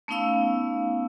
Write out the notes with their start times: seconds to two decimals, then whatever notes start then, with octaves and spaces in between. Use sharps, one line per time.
0.08 A3 B3 C#4 D#4 F5 E6